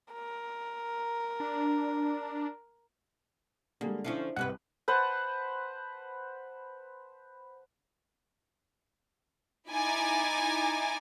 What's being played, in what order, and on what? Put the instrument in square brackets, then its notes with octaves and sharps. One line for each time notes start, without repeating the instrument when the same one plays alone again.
[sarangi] A#4
[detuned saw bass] D4
[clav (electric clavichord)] D3 [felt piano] G3 G#3 [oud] A#3
[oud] F3 C#4 F4 [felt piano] D4 E4
[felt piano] C2 F#6 [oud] G#2 C3 B4 [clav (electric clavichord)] F#5
[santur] B4 C5 F#5 A5
[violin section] D#4 E4 G#5 A#5 D6 A6